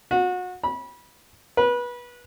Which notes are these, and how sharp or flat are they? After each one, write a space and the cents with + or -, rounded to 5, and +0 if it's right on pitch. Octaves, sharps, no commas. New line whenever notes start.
F#4 -30
B5 -25
B4 -25